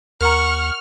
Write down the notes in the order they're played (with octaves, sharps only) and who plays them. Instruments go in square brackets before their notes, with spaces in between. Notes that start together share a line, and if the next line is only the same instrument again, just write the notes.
[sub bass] D#2 [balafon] A#4 A#5 [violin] F#5 C#6 [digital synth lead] F6